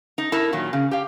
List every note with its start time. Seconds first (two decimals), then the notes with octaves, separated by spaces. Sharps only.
0.18 D#4
0.32 E4 A4 A#4
0.53 A#2 D#3 F#3
0.73 C#3
0.91 G4 F5